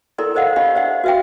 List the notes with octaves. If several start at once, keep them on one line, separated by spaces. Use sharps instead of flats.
E4 A4 A#4 D5 A#5 C6
A4 A#4 C5 D#5 F5 F#5
D4 G4 D#5 F5 B5
C5 D5 E5 F#5
F#4 B4 E5 F5 G5